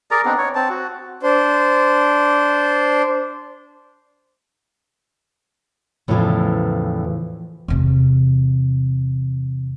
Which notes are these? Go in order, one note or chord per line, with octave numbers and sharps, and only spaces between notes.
G#4 A#4 D5 A#5
B3 C4 D4 D#4
C#5
C4 A5
F#4
D4 C5
E2 A2 C#3 E3 F3
E2 C3